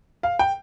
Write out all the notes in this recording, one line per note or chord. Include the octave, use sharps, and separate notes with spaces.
F5
G5